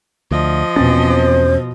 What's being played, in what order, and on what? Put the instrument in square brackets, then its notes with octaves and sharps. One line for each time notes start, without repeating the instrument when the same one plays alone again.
[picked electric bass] D2 [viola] F3 D#5
[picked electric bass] E2 C4 C#4 [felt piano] B2 A6
[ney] C5